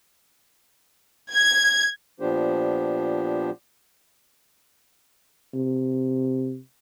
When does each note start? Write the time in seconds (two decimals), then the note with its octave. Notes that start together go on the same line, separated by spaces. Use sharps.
1.33 G#6
2.20 A#2 F3 B3 D4 G4 C5
5.54 C3